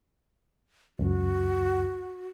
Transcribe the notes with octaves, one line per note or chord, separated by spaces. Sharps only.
C#2 F#2 F#4